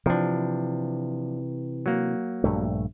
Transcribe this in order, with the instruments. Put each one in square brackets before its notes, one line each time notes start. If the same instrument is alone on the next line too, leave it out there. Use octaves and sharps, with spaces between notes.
[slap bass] C3 E3 [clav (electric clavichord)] F3 D4
[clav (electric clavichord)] F#3 A#3
[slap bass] A#1 G2 A3